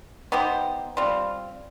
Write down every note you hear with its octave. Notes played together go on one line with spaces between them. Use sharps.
B3 D#4 G4 C5
G3 C4 F4